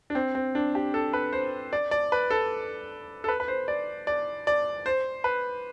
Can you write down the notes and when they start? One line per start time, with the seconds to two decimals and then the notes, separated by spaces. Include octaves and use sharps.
0.10 D4
0.15 C4
0.35 C4
0.55 D4
0.75 G4
0.94 A4
1.13 B4
1.33 C5
1.73 D5
1.91 D5
2.12 B4
2.31 A4
3.24 A4
3.28 B4
3.40 B4
3.48 C5
3.68 D5
4.07 D5
4.47 D5
4.86 C5
5.24 B4